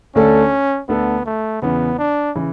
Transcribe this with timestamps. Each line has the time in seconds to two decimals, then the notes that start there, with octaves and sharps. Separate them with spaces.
0.15 D2 D3 A3 C#4 D4 A4
0.88 D2 D3 A3 B3 D4 A4
1.26 A3
1.62 E2 C#3 E3 B3
1.98 D4
2.35 C#3 E3